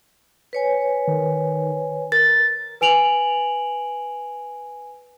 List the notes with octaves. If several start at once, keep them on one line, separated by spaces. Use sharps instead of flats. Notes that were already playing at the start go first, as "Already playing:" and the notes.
B4 C#5 G#5
D#3
A#4 A6
B4 G#5 D7 F7 F#7